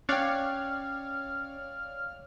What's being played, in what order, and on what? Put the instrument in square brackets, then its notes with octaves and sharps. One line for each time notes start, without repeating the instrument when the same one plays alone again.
[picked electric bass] C#4 [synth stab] C#5 D5 F5 [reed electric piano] G5 F#6 [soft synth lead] F6